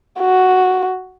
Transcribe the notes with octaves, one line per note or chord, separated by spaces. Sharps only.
F#4